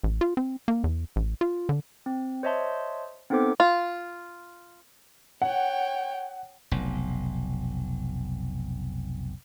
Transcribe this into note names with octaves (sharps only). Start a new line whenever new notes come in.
A1
F4
C4
A#3
E2
A1
F4
D3
C4
C5 C#5 D#5 E5 A5 C6
B3 C4 D#4 A4 C5 D6
F4
C#5 F#5 G5
F1 B1